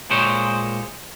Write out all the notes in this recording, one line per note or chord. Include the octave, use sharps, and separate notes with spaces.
A#2 G#3 C5 C#5